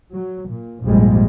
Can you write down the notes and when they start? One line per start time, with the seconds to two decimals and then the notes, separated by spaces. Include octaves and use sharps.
0.11 F#3
0.48 A#2
0.85 A#1 F2 G#2 G3 G#3